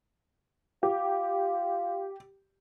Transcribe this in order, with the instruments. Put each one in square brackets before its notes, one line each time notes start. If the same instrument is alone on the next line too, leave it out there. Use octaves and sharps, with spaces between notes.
[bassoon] F4 [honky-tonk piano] G4